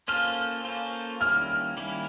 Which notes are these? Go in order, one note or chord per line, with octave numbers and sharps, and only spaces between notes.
A#3 C#4 F4 A4 C5 F6
A#3 C#4 F4 A4 C5
D#3 G3 A#3 C#4 E4 F6
D#3 G3 A#3 C#4 E4